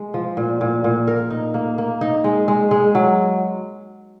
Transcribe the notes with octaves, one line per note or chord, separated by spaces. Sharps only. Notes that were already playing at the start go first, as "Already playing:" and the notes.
Already playing: G#3
F3
A#2
A#2
A#2
A#4
D#4
A#3
A#3
D#4
G#3
G#3
G#3
F#3